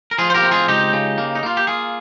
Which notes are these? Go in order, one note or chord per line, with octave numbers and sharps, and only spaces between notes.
A#4
F3 F4 G#4
C5
G4 A#4
C4
F4 G#4
C#2 D#4 G4
C#3
A#3
D#4
A#3 F4
G4
A#3 F4 G#4